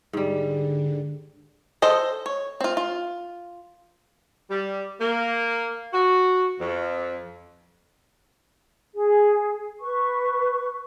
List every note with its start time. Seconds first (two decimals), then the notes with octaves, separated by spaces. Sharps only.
0.13 G#2 D3 G3
1.82 A4 C5 D#5
2.26 C#5
2.60 C4 F4
2.77 F4
4.51 G3
5.00 A#3
5.94 F#4
6.60 F2
8.94 G#4
9.81 B4 C#6